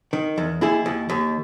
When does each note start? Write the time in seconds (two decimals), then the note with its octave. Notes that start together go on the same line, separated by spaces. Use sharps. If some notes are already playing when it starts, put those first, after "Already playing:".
0.13 D#3
0.38 E2
0.61 D#2 E4 G#4
0.86 D#2
1.10 D#2